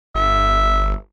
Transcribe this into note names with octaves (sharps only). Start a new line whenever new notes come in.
G1 E5